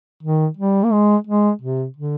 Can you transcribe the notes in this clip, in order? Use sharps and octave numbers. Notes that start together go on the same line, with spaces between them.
D#3
G3
A#3
G#3
G#3
C3
D3